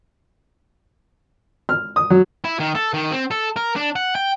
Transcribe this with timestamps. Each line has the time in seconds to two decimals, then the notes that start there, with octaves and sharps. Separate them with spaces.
1.69 F6
1.96 D#6
2.10 F#3
2.44 E4
2.60 D#3
2.75 A4
2.94 D#3
3.12 C4
3.31 A4
3.56 A#4
3.76 D4
3.96 F#5
4.15 G5